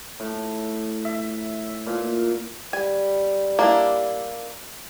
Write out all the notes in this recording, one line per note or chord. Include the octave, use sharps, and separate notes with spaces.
A2
E5
A#2
G3 G#5
A#3 D4 E4